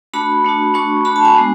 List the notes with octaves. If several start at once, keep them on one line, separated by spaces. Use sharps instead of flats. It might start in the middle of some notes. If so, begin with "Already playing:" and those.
A3 D4 F#4 B5
A3 D4 F#4
A3 D4 F#4 C#6
A3 D4 F#4 B5
A5
G#5
G#3 B3 D4 F#4